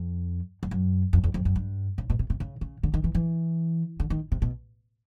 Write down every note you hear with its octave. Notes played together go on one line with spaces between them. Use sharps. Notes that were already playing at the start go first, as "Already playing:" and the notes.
Already playing: F2
F2
F#2
F2
E2
F2
F#2
G2
C#3
B2
C3
C3
C#3
C#3
D3
D#3
E3
E3
D3
D#3
C3
B2